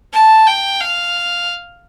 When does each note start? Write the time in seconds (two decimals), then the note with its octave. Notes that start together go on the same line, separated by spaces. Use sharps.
0.13 A5
0.47 G5
0.81 F5